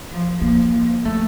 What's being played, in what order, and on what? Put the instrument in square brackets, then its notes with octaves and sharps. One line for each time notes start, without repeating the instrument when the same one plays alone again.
[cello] F3
[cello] F3 [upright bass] A#3
[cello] F3
[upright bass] A3